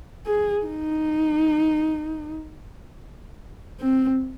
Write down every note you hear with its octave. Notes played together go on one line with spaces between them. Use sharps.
G#4
D#4
C4